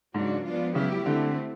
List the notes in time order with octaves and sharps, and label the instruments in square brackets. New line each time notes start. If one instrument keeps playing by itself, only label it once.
[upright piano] G#2 [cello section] C#3 F#3 A#3 D4 F#4
[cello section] F3 G#3 B3 D4 F4
[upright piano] C#3 [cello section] F#3 B3 E4 G4
[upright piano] D3 [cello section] A3 C4 E4